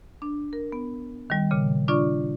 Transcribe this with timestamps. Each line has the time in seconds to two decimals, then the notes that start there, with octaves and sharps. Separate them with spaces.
0.22 D4
0.53 A#4
0.72 B3
1.30 D#3 G3
1.51 A#2 C#3
1.88 D4 F4 D5 C#6